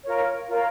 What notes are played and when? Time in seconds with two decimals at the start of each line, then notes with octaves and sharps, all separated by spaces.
0.05 F4 A#4 C#5
0.48 F4 A#4 C#5